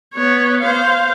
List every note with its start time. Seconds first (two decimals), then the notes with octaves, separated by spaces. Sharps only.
0.14 B3 C#5
0.61 C5 F5